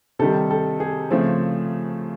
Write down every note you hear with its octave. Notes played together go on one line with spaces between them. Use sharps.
C3 D#3 G3 A4
A4
G#4
C#3 F3 A3 C4